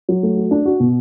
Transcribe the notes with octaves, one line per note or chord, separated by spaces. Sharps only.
F#3
A3
F#4
D4
F#4
B2